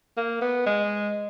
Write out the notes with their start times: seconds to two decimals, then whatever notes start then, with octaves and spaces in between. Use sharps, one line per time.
0.17 A#3
0.42 B3
0.66 G#3